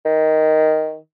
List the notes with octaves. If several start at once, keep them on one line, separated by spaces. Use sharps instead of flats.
D#3